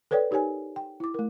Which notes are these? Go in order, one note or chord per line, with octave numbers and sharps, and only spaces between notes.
A4 B4 C#5 D5 G5
D#4 G4 A#4 C#5 G#5
G5
E4 D6
A3 A#4